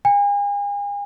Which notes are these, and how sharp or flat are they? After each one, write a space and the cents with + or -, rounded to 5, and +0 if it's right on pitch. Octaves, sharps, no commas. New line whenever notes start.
G#5 -40